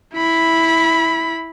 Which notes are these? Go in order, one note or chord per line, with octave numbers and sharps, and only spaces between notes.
E4 B5